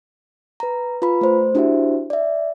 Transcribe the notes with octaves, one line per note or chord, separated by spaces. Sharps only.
B4 A#5
F4 B4 A#5 B5
A3 C5
D4 E4 F#4 G4 C5 E5
D5 E5